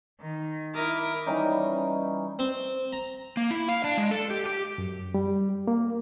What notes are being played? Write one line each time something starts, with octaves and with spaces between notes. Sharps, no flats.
D#3
E4 A#4 D6 D#6
E3 G3 C#4 D#4
C4
A#5
A#3
E4
F5
D4
G#3
A4
G4
G4
F#2
G3
A#3